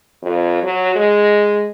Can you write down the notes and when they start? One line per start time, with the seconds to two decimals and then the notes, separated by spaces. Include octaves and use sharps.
0.22 F2
0.63 F#3
0.96 G#3